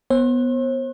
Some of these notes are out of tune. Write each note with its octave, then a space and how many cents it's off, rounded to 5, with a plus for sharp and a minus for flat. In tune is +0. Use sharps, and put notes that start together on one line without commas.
B3 +0 C5 +45